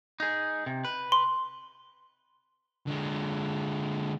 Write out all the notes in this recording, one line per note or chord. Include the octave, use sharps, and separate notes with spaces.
D#4 G#4
C3
B4
C6
D3 G#3